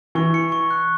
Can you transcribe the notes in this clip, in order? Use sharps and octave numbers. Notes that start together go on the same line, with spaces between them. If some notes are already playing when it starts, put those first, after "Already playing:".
E3 C#6
C#7
C#6
F#6